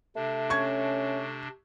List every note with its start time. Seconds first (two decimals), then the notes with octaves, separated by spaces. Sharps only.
0.16 C3 A3 D4
0.50 C#4 C#6 G#6